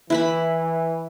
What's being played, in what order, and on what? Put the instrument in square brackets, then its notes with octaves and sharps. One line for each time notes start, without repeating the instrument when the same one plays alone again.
[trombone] E3 [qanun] E4 B4 B5